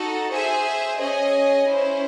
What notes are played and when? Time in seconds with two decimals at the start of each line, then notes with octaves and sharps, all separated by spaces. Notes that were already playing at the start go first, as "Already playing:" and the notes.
Already playing: D#4 F#4 A4
0.31 G#4 C5 E5 G#5
0.99 C#4 G#4 D#5 G#5
1.68 C#4 E4 C5